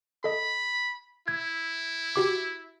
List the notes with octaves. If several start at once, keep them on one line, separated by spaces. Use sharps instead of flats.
A4 D#5 B5
E4 G#6
F#4 G4 D6